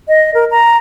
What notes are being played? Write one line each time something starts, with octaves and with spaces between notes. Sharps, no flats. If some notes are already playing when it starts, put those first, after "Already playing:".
D#5
A#4
A#5